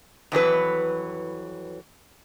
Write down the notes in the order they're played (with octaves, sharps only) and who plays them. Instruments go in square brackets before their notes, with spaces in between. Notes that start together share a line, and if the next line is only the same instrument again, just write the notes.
[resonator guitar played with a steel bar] F2 E3 F#3 B4